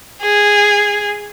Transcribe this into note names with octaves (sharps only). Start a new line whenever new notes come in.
G#4